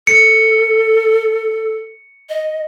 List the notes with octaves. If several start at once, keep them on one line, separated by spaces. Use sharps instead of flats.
A4 C#7
D#5